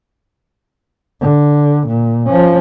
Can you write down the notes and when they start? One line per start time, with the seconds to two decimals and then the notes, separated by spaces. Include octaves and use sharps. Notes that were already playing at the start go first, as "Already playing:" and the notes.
1.21 D3
1.87 A#2
2.27 F3 C#4